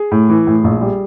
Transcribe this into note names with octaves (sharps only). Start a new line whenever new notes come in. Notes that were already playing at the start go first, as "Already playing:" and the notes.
Already playing: G#4
A2
E3
A2
A#1
G3